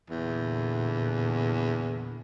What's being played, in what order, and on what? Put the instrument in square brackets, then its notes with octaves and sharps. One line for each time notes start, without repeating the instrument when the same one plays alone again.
[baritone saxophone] E2 [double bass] A#2 D3